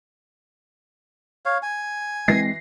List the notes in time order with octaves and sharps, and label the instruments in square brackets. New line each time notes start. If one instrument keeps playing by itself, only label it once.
[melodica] C#5 F5
G#5
[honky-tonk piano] E3 A#6 C7 [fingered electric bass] G#3 C4